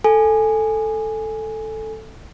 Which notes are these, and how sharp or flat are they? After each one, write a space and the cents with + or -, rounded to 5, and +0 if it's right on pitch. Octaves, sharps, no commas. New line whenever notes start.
A4 +0 G#5 +0